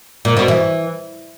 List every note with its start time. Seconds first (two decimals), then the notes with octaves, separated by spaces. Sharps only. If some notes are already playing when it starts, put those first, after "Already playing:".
0.25 A#2
0.37 B2
0.48 E3